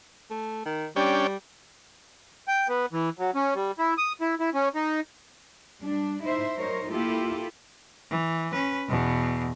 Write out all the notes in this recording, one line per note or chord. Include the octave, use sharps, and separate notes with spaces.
A3
D#3
G3 C#4 D4 G5
G5
B3
E3
F#3
C#4
G3
E4
D#6
E4
E4
C#4
D#4
G3 D4
D#4 E4 C5 E5
F#3 D#4 A#4 C5 C#5
A#3 E4 F4 G4 A4
E3
C#4 B4
E2 B2